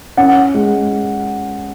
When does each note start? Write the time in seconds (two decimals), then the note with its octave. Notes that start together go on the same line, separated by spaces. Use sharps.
0.17 C#4 F#5
0.54 G#3